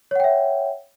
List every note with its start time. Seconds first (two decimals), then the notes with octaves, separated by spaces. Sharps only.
0.11 C#5
0.16 F#5
0.20 G5
0.24 E5